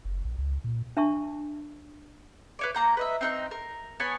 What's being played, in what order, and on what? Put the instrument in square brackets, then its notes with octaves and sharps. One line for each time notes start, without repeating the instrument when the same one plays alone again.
[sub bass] F#1
A#1
C#2
A#2
[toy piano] D4 E5 A5 C#6
[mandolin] B4 C#5 D5
A#3 A#5 G6
B4 D#5 E5
C4 D#4 F#6
A#4
B3 C#5 G#5 A5